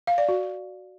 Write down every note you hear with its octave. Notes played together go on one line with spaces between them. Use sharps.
F5
D5
F#4